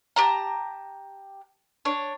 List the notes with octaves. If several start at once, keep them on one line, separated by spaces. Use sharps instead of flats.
G4 A5 A#5
D4 C#5